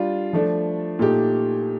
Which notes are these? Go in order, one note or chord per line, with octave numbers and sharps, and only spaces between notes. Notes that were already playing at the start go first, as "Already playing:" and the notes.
Already playing: G3 D4 F4
F3 A3 D4
A#2 A3 D#4 G4